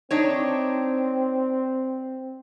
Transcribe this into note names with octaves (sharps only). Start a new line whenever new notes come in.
C4 D4 D#4 C#5